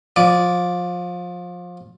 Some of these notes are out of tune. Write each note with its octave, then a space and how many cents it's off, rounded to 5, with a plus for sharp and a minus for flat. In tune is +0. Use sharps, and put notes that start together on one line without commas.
F3 +25 D5 -5